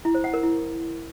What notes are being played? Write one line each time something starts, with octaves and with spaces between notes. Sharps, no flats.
E4
C5
F#5
A#4
E4